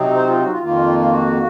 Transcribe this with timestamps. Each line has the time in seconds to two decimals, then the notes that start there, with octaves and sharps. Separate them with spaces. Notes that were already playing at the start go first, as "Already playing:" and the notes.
Already playing: C3 F#3 C4 D#4
0.15 C5
0.27 F4
0.39 F#4
0.51 F4
0.63 F2 D#3 A#3 F4
0.99 F4
1.10 F#4